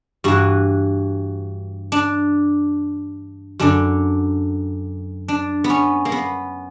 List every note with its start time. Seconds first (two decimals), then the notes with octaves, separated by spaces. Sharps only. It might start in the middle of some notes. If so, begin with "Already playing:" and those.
0.24 G2 E3 F#4
1.92 D4
3.59 F#2 D3 D4
5.28 D4
5.64 B3
5.70 C#4
6.05 A#3
6.12 B3